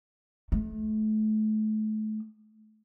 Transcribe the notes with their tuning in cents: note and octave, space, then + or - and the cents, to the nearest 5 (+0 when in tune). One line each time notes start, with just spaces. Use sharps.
A3 -30